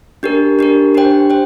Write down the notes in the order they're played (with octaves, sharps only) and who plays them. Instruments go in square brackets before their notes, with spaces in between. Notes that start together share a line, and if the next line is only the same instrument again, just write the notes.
[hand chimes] D4 G4 A#4
D4 G4 A#4
D4 G4 C5 G5
C5 G5